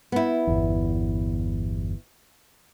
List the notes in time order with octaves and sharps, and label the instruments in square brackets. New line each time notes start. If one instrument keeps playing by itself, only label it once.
[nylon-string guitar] B3 E4
[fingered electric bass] G1 E2